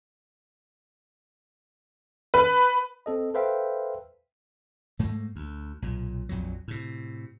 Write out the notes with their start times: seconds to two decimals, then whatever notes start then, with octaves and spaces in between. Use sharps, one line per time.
2.34 B4
3.06 C4 A4 D#5
3.34 A4 B4 C5 E5 F5 G5
4.99 G#2 A3 A#3
5.36 D2
5.82 B1 A#2
6.29 A#1 F2 A#2 F#3
6.68 A2 C3